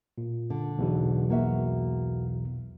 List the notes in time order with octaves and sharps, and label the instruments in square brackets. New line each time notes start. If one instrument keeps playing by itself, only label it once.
[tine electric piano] A#2
[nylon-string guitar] D3
[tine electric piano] B1 E2 B2
[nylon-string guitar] A#3 F#4 E5